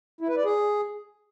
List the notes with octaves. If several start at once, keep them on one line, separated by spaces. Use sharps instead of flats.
E4
B4
D5
G#4